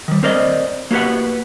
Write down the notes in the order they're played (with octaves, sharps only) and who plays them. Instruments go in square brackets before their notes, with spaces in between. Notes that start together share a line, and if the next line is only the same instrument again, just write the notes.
[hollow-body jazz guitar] D#3 G3
C4 A#4 D5 D#5
A#3 F#4 G4 B4 F#5